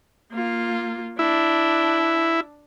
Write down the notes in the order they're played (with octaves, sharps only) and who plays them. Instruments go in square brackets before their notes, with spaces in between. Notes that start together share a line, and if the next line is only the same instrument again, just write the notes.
[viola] A#3 F4
[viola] D4 [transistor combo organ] E4